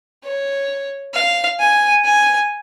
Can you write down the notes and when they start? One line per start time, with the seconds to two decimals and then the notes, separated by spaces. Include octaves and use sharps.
0.24 C#5
1.14 F5
1.59 G#5
2.04 G#5